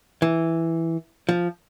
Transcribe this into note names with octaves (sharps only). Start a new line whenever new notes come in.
E3
F3